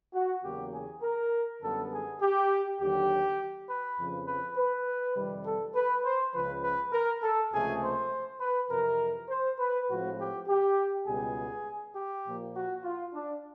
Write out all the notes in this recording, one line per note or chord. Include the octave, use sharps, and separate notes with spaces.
F#4
E2 C#3 F#3 A#3 G4
G#4
A#4
F#2 D3 G3 B3 A4
G#4
G4
D#2 D3 F#3 G4
B4
F2 C#3 F3
B4
B4
F2 C3 D#3 G3
A4
B4
C5
C#2 C#3 F3 B4
B4
A#4
A4
C#2 C3 F3 A3 G#4
C5
B4
F2 C3 E3 A#4
C5
B4
A2 F3 G#3 C4 F#4
G4
G4
C#2 B2 G3 B3 G#4
G4
A#2 F3 A#3
F#4
F4
D4